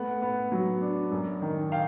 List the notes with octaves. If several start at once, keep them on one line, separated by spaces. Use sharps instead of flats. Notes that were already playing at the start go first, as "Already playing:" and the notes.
Already playing: A3 B3 F#5
B3
F#3
D4
F#2
D#3
F5 G5